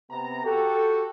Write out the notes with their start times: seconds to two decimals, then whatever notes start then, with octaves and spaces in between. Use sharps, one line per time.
0.10 C3 B3 A#5
0.44 F#4 G4 A4